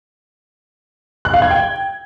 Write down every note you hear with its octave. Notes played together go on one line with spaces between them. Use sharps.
F#6
F5
G#6
G5